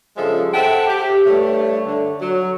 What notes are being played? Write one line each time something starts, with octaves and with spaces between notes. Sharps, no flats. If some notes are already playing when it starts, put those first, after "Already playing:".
G2 C#3 F3 G#3 A4 E5
A4 C5 E5 F#5 G5 A5
G4
G2 A3 C#5
D3
F#3